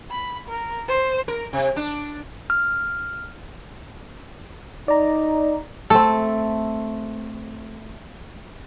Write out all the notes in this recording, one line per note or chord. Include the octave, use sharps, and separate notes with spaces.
B5
A#4
C5
A#4
C3
D4
F6
D#4 D5 A#5
A3 C4 A4